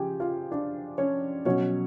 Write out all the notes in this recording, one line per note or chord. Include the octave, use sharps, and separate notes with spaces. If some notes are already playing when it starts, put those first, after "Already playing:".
Already playing: C#3 F3 G4 G5 G#5
F4 F5
D4 D5
C#4 C#5
B2 F#3 C#4 C#5